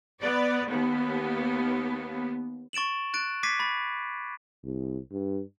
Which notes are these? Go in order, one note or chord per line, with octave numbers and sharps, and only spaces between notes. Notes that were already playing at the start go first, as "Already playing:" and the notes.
B3 D5
D#2 B3
C#6 A6 D7 E7 F#7
F#6 A6 D7
D6 G#6 A6 B6 C7 D#7
B5 A6
C2
G2